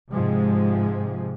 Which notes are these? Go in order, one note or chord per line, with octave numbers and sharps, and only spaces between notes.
G#2 C3 F3 G#3